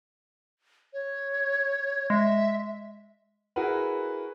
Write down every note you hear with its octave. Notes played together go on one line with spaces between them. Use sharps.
C#5
G#3 E5
E4 F#4 G#4 A#4 B4